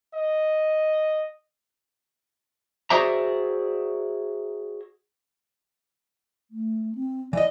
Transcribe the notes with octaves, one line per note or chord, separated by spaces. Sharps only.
D#5
F#4 G#4 C5 D5 E5 A#5
A3
C4
E3 D5 D#5